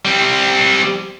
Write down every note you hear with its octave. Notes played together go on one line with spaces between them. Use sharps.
G3 C4